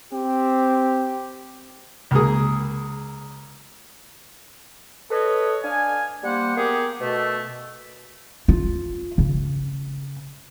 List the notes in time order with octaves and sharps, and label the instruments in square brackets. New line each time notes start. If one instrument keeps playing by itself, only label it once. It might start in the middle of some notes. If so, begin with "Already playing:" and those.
[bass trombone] C4 [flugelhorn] G4
[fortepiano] C#2 A#3 G#4
[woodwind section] A4 B4 C#5 D#5
D4 F5 G#5
G3 A#3 C5 F#5
A#3 B3 G4 G#4
B2 A3
[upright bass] F4
C#3